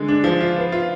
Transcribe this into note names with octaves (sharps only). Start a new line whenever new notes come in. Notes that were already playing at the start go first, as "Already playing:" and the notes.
Already playing: D3 G#3
D4
F3
F4
B3
F4